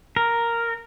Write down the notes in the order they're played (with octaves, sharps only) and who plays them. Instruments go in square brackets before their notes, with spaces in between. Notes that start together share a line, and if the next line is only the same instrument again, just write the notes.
[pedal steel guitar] A#4